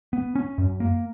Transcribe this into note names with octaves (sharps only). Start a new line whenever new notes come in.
B3
C#4
F#2
A#3